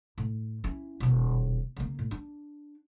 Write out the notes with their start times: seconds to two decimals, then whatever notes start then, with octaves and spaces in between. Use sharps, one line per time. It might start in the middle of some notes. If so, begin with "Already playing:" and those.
0.18 A2
0.64 C#4 E4
1.00 D#1 B2
1.77 C#3 A#3
1.99 A2
2.11 D4